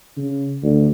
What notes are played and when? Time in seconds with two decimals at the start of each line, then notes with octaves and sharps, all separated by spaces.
0.17 C#3
0.63 D2